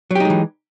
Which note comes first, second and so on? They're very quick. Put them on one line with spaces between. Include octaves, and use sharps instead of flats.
F#3 G4 D#4 G#3 E3